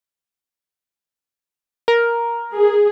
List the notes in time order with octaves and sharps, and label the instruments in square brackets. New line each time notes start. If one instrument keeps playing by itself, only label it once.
[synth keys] A#4
[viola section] G#4